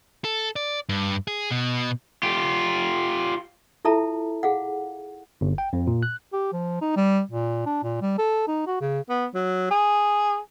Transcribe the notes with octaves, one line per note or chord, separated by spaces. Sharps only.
A4
D5
G2
G#4
B2
F4 G4
E4 F4 A4 E5 A5 A#5
G#4 F5 F#5
G1
G5
F2
A#2
F#6
G4
F3
D#4
G3
A#2
D4
A#2
G3
A4
D#4
F#4
C#3
B3
F#3
G#4